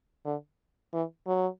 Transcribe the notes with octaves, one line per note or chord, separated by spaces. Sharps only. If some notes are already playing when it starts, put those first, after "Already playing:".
D3
E3
F#3